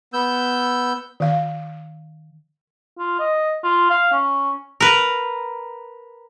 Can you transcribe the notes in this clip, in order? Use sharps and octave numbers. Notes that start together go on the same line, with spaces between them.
B3 E6 G6
D#3 F5
F4
D#5
F4
F5
C#4
A#4 B4